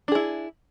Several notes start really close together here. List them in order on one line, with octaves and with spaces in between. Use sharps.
D4 G#4 E4